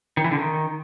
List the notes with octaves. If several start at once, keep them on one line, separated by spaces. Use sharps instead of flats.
D#3
E3
D3
D#3